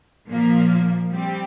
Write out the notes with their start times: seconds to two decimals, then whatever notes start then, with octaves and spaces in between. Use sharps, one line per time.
0.28 A#2 F3 A#3
1.10 G3 C4 G4